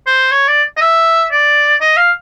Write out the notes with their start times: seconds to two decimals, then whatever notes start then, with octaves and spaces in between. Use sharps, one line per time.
0.07 C5
0.31 C#5
0.48 D5
0.77 D#5
0.81 E5
1.31 D5
1.81 D#5
1.97 F5